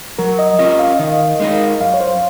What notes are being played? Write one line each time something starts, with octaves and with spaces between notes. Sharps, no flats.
F#3 A#4
D#5
C#4 F4 A#4 D#5
F5
D#3 D#5
G#3 D#4 A#4
F#2 F5
C#5
C5